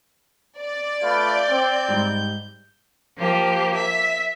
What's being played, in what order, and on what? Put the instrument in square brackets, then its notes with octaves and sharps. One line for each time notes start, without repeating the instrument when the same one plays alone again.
[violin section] D5
[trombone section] A3 F4 B4 [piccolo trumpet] G6
[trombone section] C4
[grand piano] G#2 G3
[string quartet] F3 A#3 G4
E5